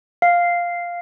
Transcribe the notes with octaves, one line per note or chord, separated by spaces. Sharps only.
F5